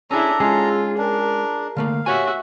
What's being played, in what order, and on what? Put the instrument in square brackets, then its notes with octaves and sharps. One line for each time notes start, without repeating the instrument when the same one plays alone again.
[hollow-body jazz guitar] C#4 G#4 [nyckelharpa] D4 E4 [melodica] A4 A#5
[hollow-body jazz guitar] G#3 C#4 D#4 [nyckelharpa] F4 [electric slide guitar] G#4
[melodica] D4 [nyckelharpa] A#4
[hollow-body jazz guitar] D3 A3 A#3 [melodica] F5
[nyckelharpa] F#4 E5 [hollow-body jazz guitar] G4 C#5 G#5